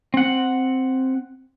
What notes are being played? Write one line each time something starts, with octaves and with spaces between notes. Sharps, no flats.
C4 F#5